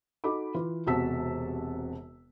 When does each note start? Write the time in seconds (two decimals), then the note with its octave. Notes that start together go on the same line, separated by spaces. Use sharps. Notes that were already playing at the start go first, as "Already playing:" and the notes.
0.24 D#4 F#4 A4 B5 D6
0.54 E3 F4 B4
0.87 E1 C3 F#4 A5 E6 B6